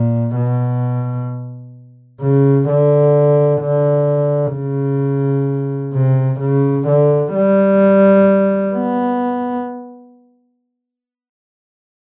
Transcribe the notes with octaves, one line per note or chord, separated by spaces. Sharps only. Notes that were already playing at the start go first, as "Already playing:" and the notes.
Already playing: A#2
B2
C#3
D3
D3
C#3
C3
C#3
D3
G3
B3